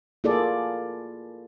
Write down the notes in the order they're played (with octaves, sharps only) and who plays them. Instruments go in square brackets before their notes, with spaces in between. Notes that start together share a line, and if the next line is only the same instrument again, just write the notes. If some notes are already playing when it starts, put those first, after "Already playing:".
[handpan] A#3 E4 F4 G#4 A4 D5